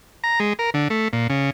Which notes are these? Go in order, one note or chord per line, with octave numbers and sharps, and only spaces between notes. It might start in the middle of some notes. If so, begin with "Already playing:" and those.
A#5
G#3
A#4
D3
A3
A#2
C#3